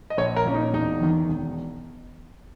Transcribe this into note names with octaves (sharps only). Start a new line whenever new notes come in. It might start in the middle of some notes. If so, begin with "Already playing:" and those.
D#5
A#1 C#5
A#4
A#2 C#4
D#4
E1 D#4
E2 D#3
E1